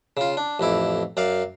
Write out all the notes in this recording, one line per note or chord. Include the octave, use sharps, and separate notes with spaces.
C#3 F4
D4
A1 F2 E4 D6
F#2 D5 F5 D6